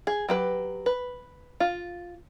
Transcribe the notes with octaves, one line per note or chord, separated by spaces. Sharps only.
G#4
F#3 G4 B4
B4
F4